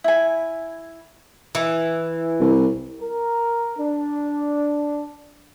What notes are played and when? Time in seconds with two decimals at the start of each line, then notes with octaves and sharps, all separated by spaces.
0.04 E4 G#5
1.55 E3
2.40 C2
3.01 A#4
3.78 D4